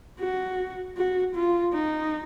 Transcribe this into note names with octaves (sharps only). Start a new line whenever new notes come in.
F#4
F#4
F4
D#4